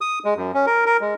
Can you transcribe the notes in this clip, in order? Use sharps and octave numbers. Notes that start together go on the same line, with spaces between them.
D#6
G#3
F#2
C#4
A#4
A#4
G#3